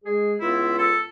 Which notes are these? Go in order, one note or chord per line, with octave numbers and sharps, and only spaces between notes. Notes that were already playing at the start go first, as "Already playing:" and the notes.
G#3 G#4
C#2 B3 E4 F4
A4